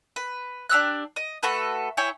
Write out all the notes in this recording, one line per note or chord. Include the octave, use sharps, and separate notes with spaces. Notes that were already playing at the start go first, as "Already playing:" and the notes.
B4
D4 G4 E6 F#6
D#5
A3 F#4 A4 B4
E4 C#5 G5 G#5